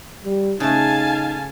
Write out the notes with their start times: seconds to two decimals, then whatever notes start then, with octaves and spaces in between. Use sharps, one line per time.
0.25 G3
0.60 C#3 A3 D#4 F5 G#5 A5